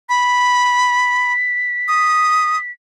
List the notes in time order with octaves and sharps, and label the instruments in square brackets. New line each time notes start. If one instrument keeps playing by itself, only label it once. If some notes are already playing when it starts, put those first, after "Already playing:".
[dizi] B5 [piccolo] B6
[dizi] D#6